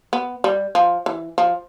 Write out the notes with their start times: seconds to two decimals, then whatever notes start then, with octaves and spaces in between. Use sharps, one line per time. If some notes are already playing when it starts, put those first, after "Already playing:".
0.13 B3
0.44 G3
0.75 F3
1.06 E3
1.38 F3